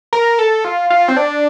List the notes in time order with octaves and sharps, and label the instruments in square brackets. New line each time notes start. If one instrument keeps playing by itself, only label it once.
[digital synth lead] A#4
A4
F4
F4
C4
D4